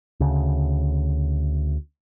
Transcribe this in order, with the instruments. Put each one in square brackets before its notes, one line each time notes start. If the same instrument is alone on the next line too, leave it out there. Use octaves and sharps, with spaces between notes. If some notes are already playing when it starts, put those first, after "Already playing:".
[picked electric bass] D2 C#3